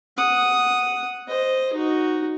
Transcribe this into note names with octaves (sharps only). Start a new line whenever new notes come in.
F#5 D#6
C5 D#5
D#4 F#4